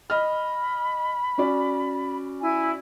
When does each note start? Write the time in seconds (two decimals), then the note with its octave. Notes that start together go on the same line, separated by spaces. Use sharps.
0.10 D#5 B5 F6
1.38 C#4 F#4 D5
2.41 E4 G#5